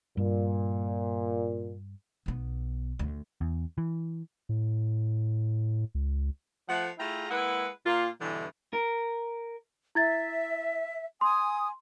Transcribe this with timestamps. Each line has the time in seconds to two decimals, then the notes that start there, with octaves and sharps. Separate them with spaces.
0.17 G2 A#2
2.26 B1 B3
2.99 D2
3.41 E2
3.78 E3
4.49 A2
5.95 C#2
6.68 F3 A3 F#5
6.99 A3 E4 F4 G#4 G5 A#5
7.30 G#3 A#3 E4 B4 F#5
7.85 A#2 A#3 F4
8.20 G2 B2 D3 E3
8.73 A#4
9.95 E4 E5 G#6 A6
11.21 G#5 C6 D#6